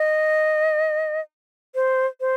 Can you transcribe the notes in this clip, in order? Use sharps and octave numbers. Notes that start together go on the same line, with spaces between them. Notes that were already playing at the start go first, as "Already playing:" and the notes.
Already playing: D#5
C5
C5